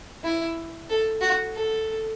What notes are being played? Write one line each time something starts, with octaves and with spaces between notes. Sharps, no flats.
E4
A4
F#4
A4